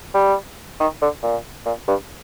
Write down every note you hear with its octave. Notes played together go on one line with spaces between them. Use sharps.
G3
D#3
D3
A#2
A#2
G2